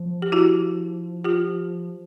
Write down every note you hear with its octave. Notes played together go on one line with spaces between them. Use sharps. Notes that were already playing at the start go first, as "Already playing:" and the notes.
Already playing: F3
G4
E4 F#4
F4 G4